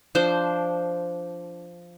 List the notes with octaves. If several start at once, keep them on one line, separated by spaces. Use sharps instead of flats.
F3 D4 C5